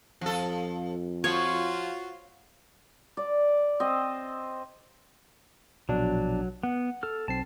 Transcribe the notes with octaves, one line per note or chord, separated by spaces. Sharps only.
F2 F3 A4
F3 F4 F#4 C#5
D5
C4 D#5
A#1 B2 F#3 D4
B3 F#5
A4 F6
B1 C4 A5 C7